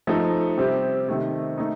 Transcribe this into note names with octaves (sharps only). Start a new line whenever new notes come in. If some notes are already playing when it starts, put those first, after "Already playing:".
F3 A3 D#4 A4
C3 G3 C4 G4
C3 D#3 A3
A3 D#4